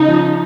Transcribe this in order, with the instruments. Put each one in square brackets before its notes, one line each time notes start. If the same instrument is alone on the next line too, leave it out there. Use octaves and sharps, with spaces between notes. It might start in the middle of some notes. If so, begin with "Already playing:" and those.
Already playing: [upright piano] C#3 [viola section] D#4
[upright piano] F3